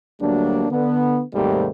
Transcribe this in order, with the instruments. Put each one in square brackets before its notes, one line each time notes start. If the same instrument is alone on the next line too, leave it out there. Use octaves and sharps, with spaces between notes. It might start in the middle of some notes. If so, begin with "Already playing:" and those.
[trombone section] D2 F#3 G3 A#3 D4
D3 B3
D#2 G#2 C3 D#3 G3 A3